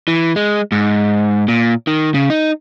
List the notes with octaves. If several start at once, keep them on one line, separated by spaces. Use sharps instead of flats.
E3
G#3
G#2
A#2
D#3
C#3
D#4